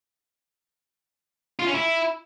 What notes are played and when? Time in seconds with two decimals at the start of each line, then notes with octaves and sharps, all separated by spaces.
1.59 F4
1.67 C#4
1.74 E4